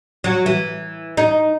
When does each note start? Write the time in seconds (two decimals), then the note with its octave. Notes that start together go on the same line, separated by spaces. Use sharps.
0.24 F#3
0.46 E3
1.17 D#4